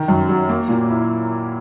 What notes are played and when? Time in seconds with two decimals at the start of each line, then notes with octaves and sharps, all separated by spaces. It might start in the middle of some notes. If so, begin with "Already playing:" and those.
Already playing: D#3
0.08 F#2
0.29 F#3
0.49 A#3
0.69 A#2
0.89 E4